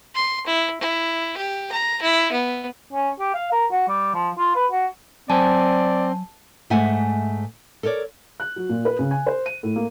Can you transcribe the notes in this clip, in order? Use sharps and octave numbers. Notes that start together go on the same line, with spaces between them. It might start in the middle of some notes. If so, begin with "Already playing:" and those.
C6
E4
E4
G4
A#5
E4
B3
C#4
G4
F5
A#4
F#4
G3
F3
F4
B4
F#4
F#3 C4 D5 G#5 A5
G#2 A3 E5 F#5 G#5
A4 A#4 C#5 D5
F#6
F#3
A#2
B4
C#3
G#5
C5
D#7
A2
A#3